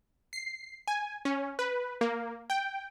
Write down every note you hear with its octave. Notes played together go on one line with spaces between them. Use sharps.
C7
G#5
C#4
B4
A#3
G5